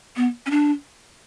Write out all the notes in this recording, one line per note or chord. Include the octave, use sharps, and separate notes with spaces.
B3
C#4
D4